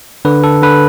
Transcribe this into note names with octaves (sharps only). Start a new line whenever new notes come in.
D3 B4
A4
D3 B4